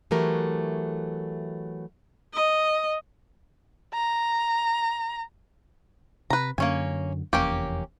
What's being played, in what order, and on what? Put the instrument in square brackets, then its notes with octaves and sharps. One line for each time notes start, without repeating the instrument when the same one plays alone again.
[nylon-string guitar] E3 F#3 A3 G4 A#4
[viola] D#5
[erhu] A#5
[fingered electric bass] C3 [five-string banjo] B4 A#5
[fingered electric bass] F#2 D3 [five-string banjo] A#3 C#4 G#5
[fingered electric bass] F1 E2 [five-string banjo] A#3 C#4 G4